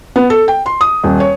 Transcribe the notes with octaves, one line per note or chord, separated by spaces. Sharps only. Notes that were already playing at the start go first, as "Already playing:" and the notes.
B3
A4
G5
C6
D#6
D#1
C#5